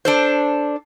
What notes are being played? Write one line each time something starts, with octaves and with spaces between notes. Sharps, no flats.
D4 A4 C5